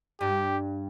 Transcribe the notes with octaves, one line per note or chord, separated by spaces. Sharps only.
G2 G4